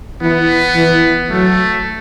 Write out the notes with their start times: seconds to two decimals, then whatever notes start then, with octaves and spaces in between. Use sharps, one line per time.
0.22 E3 B3
0.76 E3
1.30 F#3 A3